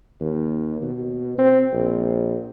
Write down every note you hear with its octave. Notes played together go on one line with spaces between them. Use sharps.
D#2
B2
C4
A#1